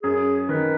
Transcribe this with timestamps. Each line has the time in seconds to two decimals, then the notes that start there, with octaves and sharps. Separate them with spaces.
0.03 F#2 G#4
0.49 D#3 B4